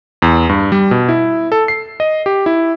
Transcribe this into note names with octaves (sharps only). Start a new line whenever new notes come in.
E2
G2
G3
B2
E4
A4
C7
D#5
G4
E4